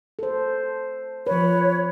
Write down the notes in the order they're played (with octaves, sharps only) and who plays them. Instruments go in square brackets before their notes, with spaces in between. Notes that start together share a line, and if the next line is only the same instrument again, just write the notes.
[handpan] A4 C5
[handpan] F3 B4 [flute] C#5